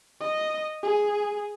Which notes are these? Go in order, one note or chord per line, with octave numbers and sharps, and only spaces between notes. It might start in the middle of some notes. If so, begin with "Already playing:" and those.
D#5
G#4